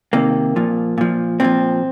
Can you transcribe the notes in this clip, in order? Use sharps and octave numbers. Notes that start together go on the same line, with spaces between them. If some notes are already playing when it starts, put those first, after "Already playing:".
C3 D#3 A#3
A#2 F3
A#2 F3
A#2 F3 C4